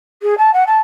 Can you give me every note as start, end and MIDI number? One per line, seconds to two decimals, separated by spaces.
0.22 0.37 68
0.37 0.52 81
0.53 0.63 78
0.66 0.81 81